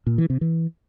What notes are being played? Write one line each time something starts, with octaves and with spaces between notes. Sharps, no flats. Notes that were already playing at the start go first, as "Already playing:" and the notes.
A#2
E3
C3
E3